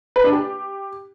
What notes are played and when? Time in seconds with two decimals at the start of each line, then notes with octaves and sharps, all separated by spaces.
0.16 B4
0.24 D4
0.32 G4